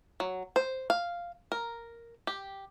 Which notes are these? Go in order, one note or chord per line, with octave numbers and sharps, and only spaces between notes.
F#3
C5
F5
A#4
G4